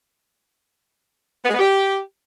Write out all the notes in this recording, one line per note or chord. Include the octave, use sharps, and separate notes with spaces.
B3
G#3
B3
G4